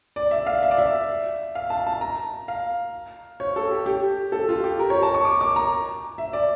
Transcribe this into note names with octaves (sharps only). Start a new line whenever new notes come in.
D5
E5
F5
E5
D5
E5
F5
A5
A5
A#5
F5
C#5
A4
G4
G4
A4
F4
G4
A#4
C#5
A5
C#6
D6
D6
A#5
E5
D5